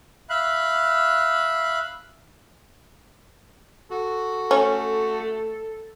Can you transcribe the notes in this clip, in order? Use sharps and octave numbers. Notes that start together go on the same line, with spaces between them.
E5 F5 B5 F#6
F#4 A4
A3 C#4